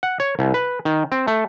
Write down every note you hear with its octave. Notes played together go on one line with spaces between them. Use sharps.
F#5
C#5
C2
B4
D#3
C4
A3